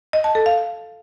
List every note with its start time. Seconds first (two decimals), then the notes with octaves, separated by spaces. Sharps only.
0.13 D#5
0.24 A5
0.35 A4
0.46 F5